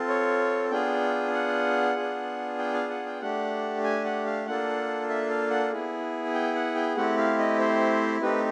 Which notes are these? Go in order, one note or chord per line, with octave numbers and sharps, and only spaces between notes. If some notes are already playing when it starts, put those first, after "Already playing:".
Already playing: C4 F4 A4
C#5
B3 D4 F4 G#4 G5
F#5
B3 D4 F4 G#4
G5
F5
F#5
G5
A3 D4 G4 F#5
G#5
F#5
F5
A#3 D4 F4 A4 F#5
E5
F5
F#5
B3 E4 G#4
G5
F#5
G5
A3 C4 E4 G4 F#5
F5
D#5
C5
A3 C4 D#4 G4 B4